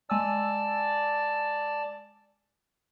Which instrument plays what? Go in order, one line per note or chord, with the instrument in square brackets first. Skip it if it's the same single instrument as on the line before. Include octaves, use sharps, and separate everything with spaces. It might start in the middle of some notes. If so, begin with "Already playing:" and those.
[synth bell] G#3 G#5 E6 [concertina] D5 A5